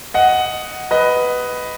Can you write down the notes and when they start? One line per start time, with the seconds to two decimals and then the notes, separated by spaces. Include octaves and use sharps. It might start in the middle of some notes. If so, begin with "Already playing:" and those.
0.14 D#5 F#5
0.91 B4 D#5